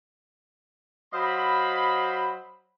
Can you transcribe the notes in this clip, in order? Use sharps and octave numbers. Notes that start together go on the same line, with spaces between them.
F#3 C5 D#5 F5 B5